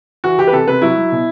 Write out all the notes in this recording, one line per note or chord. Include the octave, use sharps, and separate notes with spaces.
E3 F#4
E3 G4
B4
C3 A4
C3 B4
F#3 E4
F#3
B2